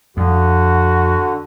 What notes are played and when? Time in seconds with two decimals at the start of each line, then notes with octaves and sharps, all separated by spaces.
0.17 F2 D3 F#4